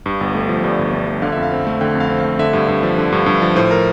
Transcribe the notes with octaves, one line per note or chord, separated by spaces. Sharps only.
G2
G1
A3
F3
G2 D5
G1
A3
F3
D3 F5
F2 E5
F5
C4
A3
D3 G5
F2
F5
C4
A3 F5
D3 E5
G2
G2
F3
D3
G2
G2
F3
A2 C5
A#4